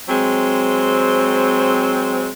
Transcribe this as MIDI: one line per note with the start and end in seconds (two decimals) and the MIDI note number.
0.08 2.28 54
0.08 2.28 56
0.08 2.28 60